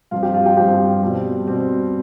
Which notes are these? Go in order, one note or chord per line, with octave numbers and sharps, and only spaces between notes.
G2 F3 C4 F4 F5
G4 G5
F4 F5
G4 G5
G2 F3 C4 G4 G5
B2 G3 C4
B2 G3 C4